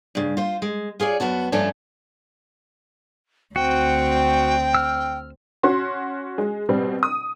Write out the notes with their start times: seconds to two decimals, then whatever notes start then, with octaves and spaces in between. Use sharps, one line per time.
0.15 G2 C#3
0.37 F4 C5
0.62 G#3
1.00 F4 G#4 C#5 D5
1.20 F#2 B3 F#4 A5
1.52 G2 F3 A3 C#4 D4
3.56 D2 C4 F#4 G5
4.75 E6 F6
5.63 C#4 F#4 C6
6.38 G#3
6.69 B2 G3 C4
7.03 D#6